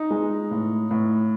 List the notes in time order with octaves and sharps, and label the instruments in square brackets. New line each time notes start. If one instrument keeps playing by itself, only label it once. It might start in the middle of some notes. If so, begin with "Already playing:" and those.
Already playing: [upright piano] D#4
G#3
A2
A2